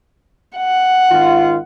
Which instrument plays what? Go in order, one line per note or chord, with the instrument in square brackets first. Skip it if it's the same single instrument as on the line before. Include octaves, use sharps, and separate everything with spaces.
[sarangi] F#5
[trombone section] G#1 D#3 F4